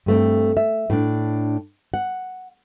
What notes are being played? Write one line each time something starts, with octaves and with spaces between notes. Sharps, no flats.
G2 A3 C4
E5
A2 D4
F#5